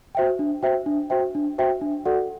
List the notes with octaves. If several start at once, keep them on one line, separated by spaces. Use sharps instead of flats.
F#4 C5 E5 G5
D4
F#4 C5 E5 G5
D4
F#4 C5 E5 G5
D4
F#4 C5 E5 G5
D4
F#4 A4 D5 F#5